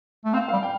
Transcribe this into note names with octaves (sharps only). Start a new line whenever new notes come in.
A3
C4 F5
G3 F5
G5